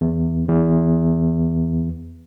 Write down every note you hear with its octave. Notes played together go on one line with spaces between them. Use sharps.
E2
E2